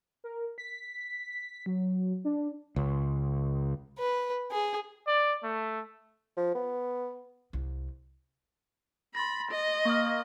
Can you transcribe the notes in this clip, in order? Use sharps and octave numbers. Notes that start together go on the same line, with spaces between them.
A#4
B6
F#3
D4
C#2
B4
G#4
D5
A3
F3
B3
C2
B5 C6 A6 A#6
D#5
A#3 C#6 D#6 F6